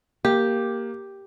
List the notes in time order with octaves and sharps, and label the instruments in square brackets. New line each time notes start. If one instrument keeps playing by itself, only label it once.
[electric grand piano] A#3 [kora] G4